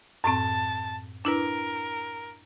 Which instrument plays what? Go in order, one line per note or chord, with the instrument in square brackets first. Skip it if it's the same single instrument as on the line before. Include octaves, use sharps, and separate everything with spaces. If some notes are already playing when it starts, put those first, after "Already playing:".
[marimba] F#2 A2 C4 [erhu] A5
[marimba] D4 E4 B4 [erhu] A#4